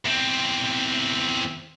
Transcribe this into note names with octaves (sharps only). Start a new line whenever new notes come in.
E2 C4